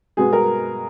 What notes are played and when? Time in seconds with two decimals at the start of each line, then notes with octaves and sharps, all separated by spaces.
0.17 B2 G#3 B3 G#4
0.33 A#4